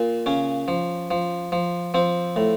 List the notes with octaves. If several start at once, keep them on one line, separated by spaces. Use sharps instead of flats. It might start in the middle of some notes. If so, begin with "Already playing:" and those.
Already playing: A#2
C#3 C#4
F3
F3
F3
F3 C4
A2